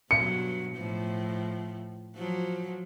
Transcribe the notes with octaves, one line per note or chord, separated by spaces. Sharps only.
G2 B2 F#3 C#7
A2 F3
F3 F#3